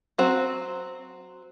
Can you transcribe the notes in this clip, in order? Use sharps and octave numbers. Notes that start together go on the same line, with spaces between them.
F#3 C4 F#4